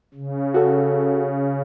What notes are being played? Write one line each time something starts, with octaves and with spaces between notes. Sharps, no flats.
C#3
F#4 A4